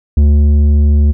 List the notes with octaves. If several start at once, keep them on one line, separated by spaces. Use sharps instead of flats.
D2